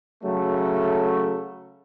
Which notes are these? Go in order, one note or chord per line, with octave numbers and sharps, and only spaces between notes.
C#3 F#3 A3